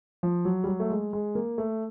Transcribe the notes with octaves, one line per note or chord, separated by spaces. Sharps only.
F3
F#3
G3
F#3
A3
G#3
G#3
A#3
A3